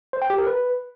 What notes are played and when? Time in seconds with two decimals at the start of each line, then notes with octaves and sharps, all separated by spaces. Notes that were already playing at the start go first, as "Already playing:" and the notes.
0.13 C5
0.22 G5
0.30 G4
0.38 A#4
0.47 B4